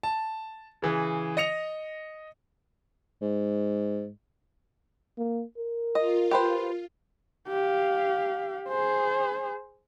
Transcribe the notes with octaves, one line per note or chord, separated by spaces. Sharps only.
A5
C#3 E3 G#4
D#5 A#6 C#7 F7
G#2
A#3
A#4
F4 D#5
G4 B4 C5
G4 F5
G#4 C5